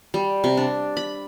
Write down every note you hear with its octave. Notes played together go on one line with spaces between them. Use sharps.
G3
C3
D4
B5